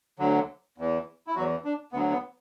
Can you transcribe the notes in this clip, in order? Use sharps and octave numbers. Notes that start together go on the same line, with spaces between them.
D2 D3 F#3
E2 E3
E4
E2 E3 F#3 F#4
D4
D2 D3 F#3 B3
B3